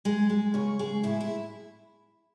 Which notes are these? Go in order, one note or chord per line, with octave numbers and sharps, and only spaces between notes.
G#3
G#3
C#3 C#5
G#3 G#4
A2 E4
E4